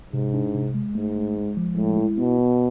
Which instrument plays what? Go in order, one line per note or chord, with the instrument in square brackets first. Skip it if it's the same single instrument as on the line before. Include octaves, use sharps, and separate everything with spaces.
[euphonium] G#2 [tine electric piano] C3
[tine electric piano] D4
C3
G#3
[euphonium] G#2 [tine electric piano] A3
[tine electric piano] A3
G#3
F3
[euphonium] A2 [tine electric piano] G#3
[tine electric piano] E4
[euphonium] B2 [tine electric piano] B3
[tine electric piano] B3